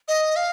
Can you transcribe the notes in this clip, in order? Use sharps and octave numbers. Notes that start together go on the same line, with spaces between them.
D#5
F5